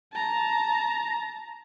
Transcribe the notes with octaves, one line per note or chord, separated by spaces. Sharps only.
A5 A#5